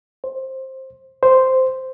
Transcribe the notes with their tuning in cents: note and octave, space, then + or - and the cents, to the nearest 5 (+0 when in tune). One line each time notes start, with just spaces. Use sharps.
C5 +15
C5 -5